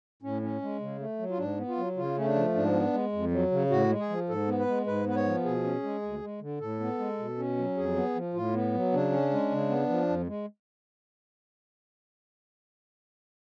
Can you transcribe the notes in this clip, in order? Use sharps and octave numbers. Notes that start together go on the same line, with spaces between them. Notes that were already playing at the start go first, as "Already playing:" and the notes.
A2 C#4
C#4
G#3
C#3
A3
F#3
F4
G#2 D4
B3
F4
F#3
C#3 F4
A3 C#4
D4
F3
G#2 D4
B3
G#3
F2
F#3
C#3
A2 F#4
G#3
G#4
F3
G#2 A4
B3
B4
G#3
G#2 B4
B3 B4
C#5
F3
B2 G#4
C#4
G#3
D2
G#3
D3
A2 A4
B3
G#3
B2
C#4
F#3
F2 G#4
B3
F3
A2 F4
B3
F#3
C#3 D4
C#4
G#3
C#3
B3
F3
F2
G#3